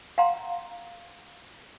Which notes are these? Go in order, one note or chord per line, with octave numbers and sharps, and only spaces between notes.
F5 F#5 A#5 C6